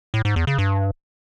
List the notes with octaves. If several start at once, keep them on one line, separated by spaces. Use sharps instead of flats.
A2
G#2
E2
C#3
G2